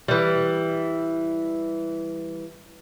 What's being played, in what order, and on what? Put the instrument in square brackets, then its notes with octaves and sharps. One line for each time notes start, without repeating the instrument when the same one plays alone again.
[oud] E3 G3